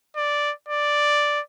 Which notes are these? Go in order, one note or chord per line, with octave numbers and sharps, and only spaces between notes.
D5
D5